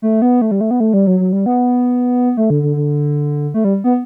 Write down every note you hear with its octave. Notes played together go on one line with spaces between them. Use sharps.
A3
B3
A3
G3
A3
B3
A3
G3
F#3
F#3
G3
B3
A3
D3
D3
D3
A3
G3
B3